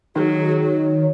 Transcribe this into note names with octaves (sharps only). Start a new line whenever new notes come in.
D#3 F#3 G#4
C#5